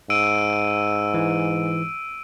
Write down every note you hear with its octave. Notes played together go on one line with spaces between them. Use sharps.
G#2 E6 D7 D#7
E3